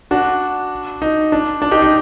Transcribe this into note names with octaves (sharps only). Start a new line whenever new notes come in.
D4 F#4
D#4
D4
D4
D#4 G4
D#4